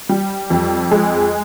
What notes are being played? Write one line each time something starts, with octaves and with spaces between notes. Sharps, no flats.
G3
F2
G#3